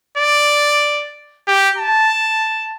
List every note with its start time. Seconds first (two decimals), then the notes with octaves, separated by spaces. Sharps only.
0.17 D5
1.47 G4
1.78 A5